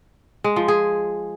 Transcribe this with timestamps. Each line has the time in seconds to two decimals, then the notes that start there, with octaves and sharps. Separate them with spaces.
0.44 G#3
0.56 F3
0.68 G#4